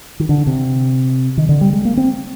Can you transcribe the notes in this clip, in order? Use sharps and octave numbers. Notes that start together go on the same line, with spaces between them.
D#3
D3
C3
D#3
D3
G3
G#3
A#3
C4